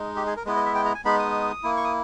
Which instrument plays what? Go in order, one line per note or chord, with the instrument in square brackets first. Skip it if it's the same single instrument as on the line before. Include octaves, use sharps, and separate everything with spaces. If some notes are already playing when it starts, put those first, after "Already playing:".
Already playing: [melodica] G#3 D#4
G4
G#4
A#4
G#3 B3 E4 B4
D#5
E5
G5
A#5
G#5
G#3 B3 D#4 B5
D#6
A#3 E4
C#6
D#6